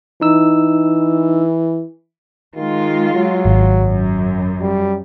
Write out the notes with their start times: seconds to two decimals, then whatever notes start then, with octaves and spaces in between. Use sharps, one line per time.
0.22 E3 D#4 E6
2.56 D#3 G#3 F4
3.15 F#3
3.45 G#1
3.80 F#2
4.61 G3